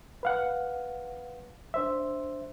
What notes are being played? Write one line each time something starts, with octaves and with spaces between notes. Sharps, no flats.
B4 F5 F#5
D4 C5 E5